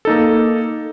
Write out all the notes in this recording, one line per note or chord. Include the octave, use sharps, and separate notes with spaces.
A#3 D#4 A4